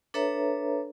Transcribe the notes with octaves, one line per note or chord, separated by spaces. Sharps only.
D4 A4 B4 C#5 E5 A#5